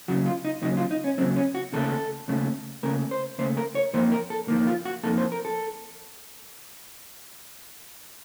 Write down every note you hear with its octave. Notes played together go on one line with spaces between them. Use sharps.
D#2 C#3 F#3 F#4
F4
D#4
D#2 C#3 F#3 D#4
F4
D#4
C#4
D#2 C#3 F#3 C4
C#4
F#4
D#2 C#3 A3 A4
D#2 C#3 A3
D#2 C#3 A3 A#4
C5
D#2 C#3 A3 C5
A#4
C#5
F2 D#3 A#3 C5
A#4
A4
F2 D#3 A#3
F4
F#4
F2 D#3 A#3 A4
C5
A#4
A4